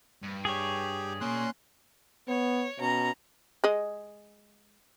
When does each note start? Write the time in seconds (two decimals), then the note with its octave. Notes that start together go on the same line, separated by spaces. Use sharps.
0.22 G2
0.45 G4 G#4 C#5
1.21 A#3 C#4 D5 C6 F#6
2.28 B3 C#5
2.79 B2 C#4 A#5
3.64 G#3 D#5